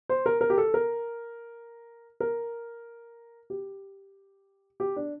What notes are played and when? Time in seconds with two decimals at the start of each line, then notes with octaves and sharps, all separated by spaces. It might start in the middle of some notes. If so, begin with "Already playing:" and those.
0.09 C5
0.26 A#4
0.41 A#4
0.50 G4
0.58 A4
0.74 A#4
2.20 A#4
3.50 G4
4.80 G4
4.96 D4